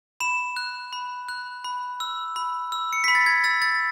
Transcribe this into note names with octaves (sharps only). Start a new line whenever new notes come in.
B5 E7
F#6
B5
F#6
B5
E6
B5
E6
C#7
B5 B6
A6
G#6
E6 A6
A6